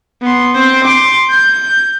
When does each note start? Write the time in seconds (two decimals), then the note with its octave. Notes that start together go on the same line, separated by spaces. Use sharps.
0.22 B3 C6
0.55 C4 C5
0.84 C6 D6
1.30 G6